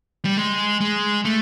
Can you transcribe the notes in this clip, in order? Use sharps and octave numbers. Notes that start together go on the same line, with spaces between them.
G3
G#3
G#3
A3